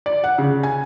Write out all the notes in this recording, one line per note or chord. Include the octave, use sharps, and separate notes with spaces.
D5
F#5
C#3
G#5